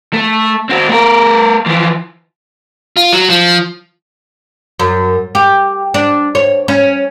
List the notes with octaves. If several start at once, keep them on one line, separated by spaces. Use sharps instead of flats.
A3
C4 F#4
A3 A#4
E3 F3
F4
F#3
F3
F#2
G4
D4
C#5
C#4